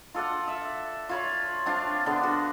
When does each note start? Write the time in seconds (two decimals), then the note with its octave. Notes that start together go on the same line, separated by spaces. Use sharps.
0.14 F4 A4 D5 F#5
0.48 E5
1.09 F4 C#5 B5
1.66 C4 D4 F4
2.06 D3 B3
2.23 F#4